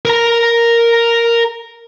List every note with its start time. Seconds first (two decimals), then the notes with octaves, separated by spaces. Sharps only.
0.05 A#4 A#5